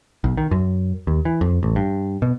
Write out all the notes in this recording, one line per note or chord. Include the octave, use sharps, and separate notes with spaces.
B1
D#3
F#2
D#2
E3
F2
A1
G2
B2